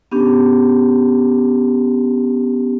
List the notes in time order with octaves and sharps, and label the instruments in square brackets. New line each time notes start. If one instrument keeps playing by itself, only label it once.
[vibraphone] B3 C#4 D4 G4